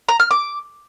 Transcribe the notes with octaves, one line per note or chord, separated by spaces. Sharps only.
A#5
F6
D6